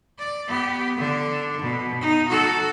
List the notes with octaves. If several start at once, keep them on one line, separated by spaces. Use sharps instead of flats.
D5
B3 G4
D3 D4
B2
D#4
F#4 A4